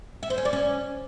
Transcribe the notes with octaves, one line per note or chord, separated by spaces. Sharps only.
E5
C5
C#4
D5
C#4